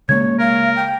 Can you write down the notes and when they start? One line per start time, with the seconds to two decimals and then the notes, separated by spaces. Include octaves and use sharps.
0.09 C#3 G#3 A#3 C#5 G#6
0.39 A#4 F5
0.76 G5